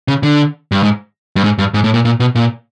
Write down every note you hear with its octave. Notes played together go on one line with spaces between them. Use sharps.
C#3
D3
G2
G#2
G2
G#2
G2
G#2
A2
A#2
A#2
B2
A#2